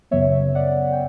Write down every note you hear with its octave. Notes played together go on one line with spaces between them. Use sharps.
F#2 C#3 F#3 B3 C#5 E5
D5 F#5
G5